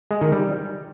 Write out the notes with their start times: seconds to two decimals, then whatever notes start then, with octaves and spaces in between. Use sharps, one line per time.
0.11 G#3
0.21 D#3
0.32 G3